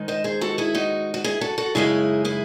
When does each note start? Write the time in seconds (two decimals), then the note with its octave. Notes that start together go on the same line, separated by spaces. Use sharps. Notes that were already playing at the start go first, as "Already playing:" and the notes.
Already playing: G#2 D#3 G#3 D#4
0.08 C5 D#5
0.24 G#4 C5
0.41 F#4 A4
0.58 E4 G#4
0.75 D#4 F#4
1.14 F#4
1.24 E4 G#4
1.41 F#4 A4
1.58 F#4 A4
1.75 F#2 C#3 G#3 D#4 E4 G#4
2.25 E4 G#4